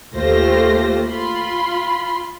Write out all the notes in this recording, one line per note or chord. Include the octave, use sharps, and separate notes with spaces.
D#2 A3 F4 G4 C5 A#6
F4 B5 C6